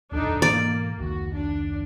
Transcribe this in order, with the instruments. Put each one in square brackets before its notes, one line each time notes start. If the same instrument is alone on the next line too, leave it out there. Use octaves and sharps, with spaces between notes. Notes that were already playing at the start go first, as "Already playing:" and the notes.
[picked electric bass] D#1 B1 F2 [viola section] D4 D#4 A4
[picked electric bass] G#2 B2 E3 [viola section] A#3 [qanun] D5
[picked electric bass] F1 C#2 D#3 [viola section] F#4
[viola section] D4